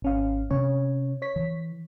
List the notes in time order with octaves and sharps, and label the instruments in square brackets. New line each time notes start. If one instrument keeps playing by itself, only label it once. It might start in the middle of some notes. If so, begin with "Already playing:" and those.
[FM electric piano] G#1 C#4 F5
[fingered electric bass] C3 C#4 [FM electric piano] C#5
[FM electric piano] C#5 B6
[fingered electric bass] E3